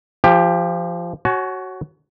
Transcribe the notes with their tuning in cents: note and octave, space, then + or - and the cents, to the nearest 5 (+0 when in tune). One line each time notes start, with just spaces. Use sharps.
F3 -20 G4 +15
F#4 +15 C#5 -15 G#5 +45